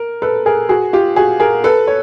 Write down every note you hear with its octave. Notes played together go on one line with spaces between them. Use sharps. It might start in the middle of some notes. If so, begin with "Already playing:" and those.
Already playing: A#4
A4 B4
G#4 A#4
F#4 G#4
F4 G4
F#4 G#4
G#4 A#4
A4 B4
C#5